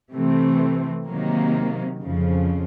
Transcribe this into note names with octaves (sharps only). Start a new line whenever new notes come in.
C3 E3 A3 C4
C3 D#3 F#3 A#3
F2 C#3 F3